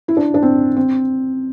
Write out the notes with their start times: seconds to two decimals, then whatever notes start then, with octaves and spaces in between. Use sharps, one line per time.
0.08 E4
0.17 D4
0.34 D4
0.42 C4
0.77 C4